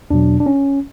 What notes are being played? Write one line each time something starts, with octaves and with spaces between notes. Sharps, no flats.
E2 B2 F#3 D4
D4
C#4